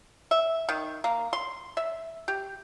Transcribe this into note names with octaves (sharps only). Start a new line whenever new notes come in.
E5
D#3
A#3
C6
E5
G4